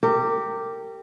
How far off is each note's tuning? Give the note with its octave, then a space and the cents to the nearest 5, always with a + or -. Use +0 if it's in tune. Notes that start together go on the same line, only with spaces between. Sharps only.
G4 +0 A#4 -30